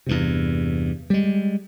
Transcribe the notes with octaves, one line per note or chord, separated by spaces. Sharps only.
E2 G2 C3
G3 G#3